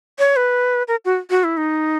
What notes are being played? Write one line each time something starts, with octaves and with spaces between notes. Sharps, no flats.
C#5
B4
A#4
F#4
F#4
E4
D#4